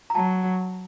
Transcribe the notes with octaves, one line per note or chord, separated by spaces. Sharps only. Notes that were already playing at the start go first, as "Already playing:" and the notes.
A#5
F#3 A5